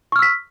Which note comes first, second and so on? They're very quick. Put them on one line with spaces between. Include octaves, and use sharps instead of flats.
C#6 F6 E6 B6